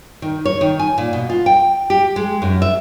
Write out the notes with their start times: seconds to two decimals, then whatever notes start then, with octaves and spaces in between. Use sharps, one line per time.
0.22 D#3
0.45 C#5
0.61 D#3
0.79 G#5
0.98 A#2
1.13 B2
1.29 F4
1.46 G5
1.90 G4
2.16 G#3
2.42 F#2
2.62 E5